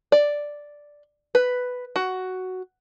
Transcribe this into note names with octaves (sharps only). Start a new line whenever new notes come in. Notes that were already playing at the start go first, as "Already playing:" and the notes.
D5
B4
F#4